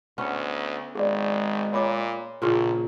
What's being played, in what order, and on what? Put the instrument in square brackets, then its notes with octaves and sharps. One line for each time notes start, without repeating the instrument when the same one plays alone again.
[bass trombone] D2 [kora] B3 C#4
[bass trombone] G#1 [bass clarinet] G#3 [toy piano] G#4 D5
[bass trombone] A#2 [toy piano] C#5 B5 D6
[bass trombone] A#1 [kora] A#2 C#3